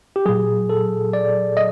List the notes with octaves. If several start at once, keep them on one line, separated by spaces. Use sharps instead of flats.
G4
A#2 F#3 G#4
A4
D5
D#5